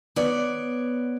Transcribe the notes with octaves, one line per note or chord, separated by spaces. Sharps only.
B3 C#5 D5